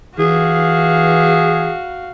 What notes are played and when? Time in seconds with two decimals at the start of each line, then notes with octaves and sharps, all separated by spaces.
0.19 E3 F#4 G#4 F5